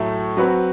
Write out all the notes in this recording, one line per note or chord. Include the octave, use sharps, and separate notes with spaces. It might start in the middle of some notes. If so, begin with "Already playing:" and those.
Already playing: A2 F#3 A3
F#3 C4 F#4 B4